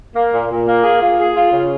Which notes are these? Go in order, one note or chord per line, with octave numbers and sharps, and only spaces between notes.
A#3
A#2
A#2
A#3
G#4
F4
G#4
F4
C#3